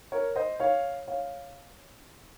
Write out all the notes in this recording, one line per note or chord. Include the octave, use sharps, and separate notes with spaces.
A#4 C#5
C5 D#5
C#5 F5
C#5 F5